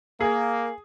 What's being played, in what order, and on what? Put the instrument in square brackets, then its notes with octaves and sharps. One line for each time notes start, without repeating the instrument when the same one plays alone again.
[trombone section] A#3 [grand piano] G#4